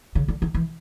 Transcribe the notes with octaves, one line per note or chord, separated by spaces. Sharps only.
C#3
D3
D#3
E3